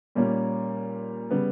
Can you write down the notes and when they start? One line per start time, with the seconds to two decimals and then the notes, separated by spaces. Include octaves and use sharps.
0.15 A#2 G3 A#3 C#4
1.31 C#3 G3 B3